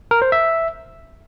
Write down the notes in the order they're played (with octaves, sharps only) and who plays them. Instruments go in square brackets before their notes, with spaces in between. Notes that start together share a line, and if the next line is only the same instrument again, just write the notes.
[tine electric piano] A#4
C5
E5